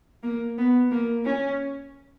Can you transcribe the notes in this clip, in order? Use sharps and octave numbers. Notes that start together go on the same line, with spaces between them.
A#3
B3
A#3
C#4